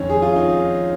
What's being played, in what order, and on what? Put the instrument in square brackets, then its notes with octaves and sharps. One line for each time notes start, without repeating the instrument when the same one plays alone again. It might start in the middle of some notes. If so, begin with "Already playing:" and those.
Already playing: [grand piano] F2 D#3 C#4
G#4
F4
D#4